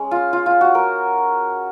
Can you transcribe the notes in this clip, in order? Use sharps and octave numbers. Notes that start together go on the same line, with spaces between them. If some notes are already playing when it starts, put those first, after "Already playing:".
Already playing: G#3 C#4
F4
F4
F4
F#4
A#4